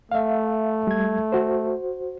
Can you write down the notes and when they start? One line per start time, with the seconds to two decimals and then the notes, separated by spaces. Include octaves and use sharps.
0.11 A3 E5 F5
0.87 G3 G#6
1.32 F#4 C5